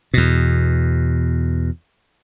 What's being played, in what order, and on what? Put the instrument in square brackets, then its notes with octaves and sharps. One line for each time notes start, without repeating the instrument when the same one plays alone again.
[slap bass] E2 B2